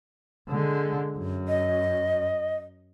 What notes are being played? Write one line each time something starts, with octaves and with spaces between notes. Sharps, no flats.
D3 G#3
F#2
D#5